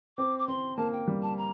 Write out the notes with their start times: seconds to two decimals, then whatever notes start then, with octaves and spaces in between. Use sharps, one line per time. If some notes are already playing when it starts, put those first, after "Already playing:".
0.18 C4 D6
0.39 D6
0.47 C4 C6
0.77 A#3 A5
0.92 G5
1.08 G3
1.23 A5
1.37 A#5